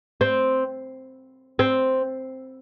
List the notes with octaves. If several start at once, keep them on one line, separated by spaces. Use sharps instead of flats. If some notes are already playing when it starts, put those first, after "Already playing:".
C4
C4